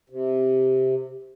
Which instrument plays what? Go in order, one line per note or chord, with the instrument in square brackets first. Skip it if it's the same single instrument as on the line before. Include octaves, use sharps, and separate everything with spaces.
[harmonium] C3